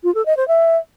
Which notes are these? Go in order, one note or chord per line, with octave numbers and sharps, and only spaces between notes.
F4
A4
D#5
C5
E5